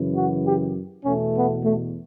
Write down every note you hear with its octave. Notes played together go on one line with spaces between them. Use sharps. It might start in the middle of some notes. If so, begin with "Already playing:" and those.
Already playing: F#2 C#3 E3
F#4
G4
E2 B2 A3 C#4
B3
A3